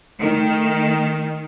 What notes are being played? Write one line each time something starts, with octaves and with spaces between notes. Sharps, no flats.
D#3 A3